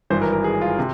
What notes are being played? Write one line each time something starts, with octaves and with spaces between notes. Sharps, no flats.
G#1 G2 E3 C5
A#4
A#4
G#4
F4
C3